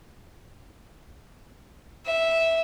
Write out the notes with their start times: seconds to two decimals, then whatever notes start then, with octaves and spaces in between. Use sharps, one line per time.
2.06 E5